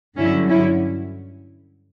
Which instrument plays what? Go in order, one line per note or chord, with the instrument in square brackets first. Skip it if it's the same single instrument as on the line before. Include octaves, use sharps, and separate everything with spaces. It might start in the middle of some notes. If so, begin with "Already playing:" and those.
[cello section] G2 D3 F#3 C#4 E4
C#4 E4